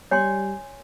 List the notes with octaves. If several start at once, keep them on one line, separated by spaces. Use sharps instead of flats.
G3 C#5 G#5 C6 C7 C#7